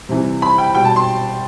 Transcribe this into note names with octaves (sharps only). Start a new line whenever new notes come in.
C3 E3 G3
B5
G5
B2 G3 G5
A5
C6